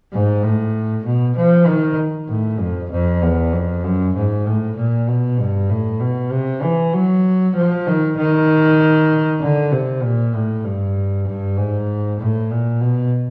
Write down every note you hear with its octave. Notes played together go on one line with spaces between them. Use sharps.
G#2
A2
B2
F3
D#3
A2
F2
F2
E2
F2
F#2
G#2
A2
A#2
B2
G2
A2
B2
C3
E3
F#3
F3
D#3
D#3
D3
C3
A#2
A2
G2
G2
G#2
A2
A#2
B2